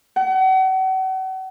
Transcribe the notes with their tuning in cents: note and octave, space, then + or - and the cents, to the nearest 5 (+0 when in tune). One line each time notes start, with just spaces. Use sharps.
F#5 +40